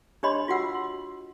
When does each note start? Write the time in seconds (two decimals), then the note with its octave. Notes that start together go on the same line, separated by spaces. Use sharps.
0.23 D4 G4 C#5 D#5 B5 C6
0.48 F4 F#4 F#5 E6
0.74 C6